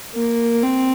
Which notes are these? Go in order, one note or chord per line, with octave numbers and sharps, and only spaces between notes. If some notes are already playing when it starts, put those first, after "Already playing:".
A#3
C4